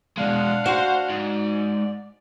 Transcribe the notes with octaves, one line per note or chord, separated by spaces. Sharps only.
B2 G#3 D4 F5 F#5
F#4 C5 C6
G#2 D5